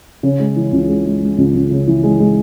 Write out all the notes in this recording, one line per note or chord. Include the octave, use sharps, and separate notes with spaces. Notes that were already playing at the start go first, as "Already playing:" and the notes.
C#3
G#3
E3
C#2
G#3
G#3
G#3
C#2
C#2
C#3
E3
G#3
G#3